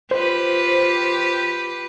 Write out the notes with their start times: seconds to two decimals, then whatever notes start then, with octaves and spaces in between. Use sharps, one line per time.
0.11 F4 G4 B4 C5